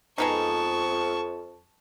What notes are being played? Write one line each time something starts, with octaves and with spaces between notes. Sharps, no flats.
F2 G#3 B3 D#4 A5 C#6